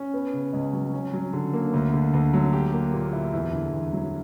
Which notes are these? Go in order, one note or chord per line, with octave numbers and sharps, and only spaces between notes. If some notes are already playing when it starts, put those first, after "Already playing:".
Already playing: C#4
B3
C#3
C#2
F#3
C#4
F#3
D3
A#3
D2
D3
D2
F#3
G4
A#3
A#2
E4
E2
D3
E2
F#3